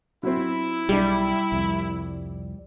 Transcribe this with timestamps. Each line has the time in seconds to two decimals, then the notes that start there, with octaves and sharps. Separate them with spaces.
0.23 F#3 C4 E4
0.89 B1 G3 D4 G4
1.52 C2 F2